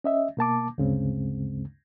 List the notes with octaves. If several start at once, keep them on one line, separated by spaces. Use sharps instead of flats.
C#4 D#5 E5
B2 A#3 A5 D6
D2 G2 C#3 G#3 C4